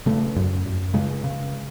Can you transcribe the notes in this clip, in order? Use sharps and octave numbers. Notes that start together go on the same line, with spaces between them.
C#3 A3
F#2
F#2
C#3 G#3
C#3